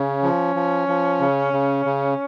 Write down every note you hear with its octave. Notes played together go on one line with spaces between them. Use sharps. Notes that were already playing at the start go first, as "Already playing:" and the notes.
Already playing: C#3 C#4
F3
F3
F3
C#3
C#3
C#3